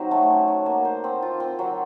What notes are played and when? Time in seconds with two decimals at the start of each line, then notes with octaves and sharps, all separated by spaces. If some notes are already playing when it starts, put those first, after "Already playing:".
Already playing: F#3 C4 D#4 F#4
0.11 A3
0.30 C#4
0.48 F#3
0.66 A#3
0.85 C5
1.04 C4
1.22 F4
1.40 C4
1.59 F#3